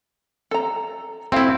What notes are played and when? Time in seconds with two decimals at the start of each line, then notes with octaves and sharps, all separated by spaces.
0.51 A4 A#5
1.32 C4 E4 F#4 A4 F5